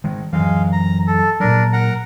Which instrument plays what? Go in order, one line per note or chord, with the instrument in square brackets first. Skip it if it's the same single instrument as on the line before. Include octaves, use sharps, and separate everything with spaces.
[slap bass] D#3 G#3
[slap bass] F#2 E3 F#3 [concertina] G#3 F5
[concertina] A#5
A4
[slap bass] A#2 F#3 [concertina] D4 A#4
[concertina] A#4 F#5 A#5